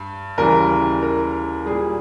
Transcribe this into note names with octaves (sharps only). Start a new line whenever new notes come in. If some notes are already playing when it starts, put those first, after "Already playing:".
Already playing: G2
D#2 C#3 E3 G3 A#4
A#4
A#2 G3 G#4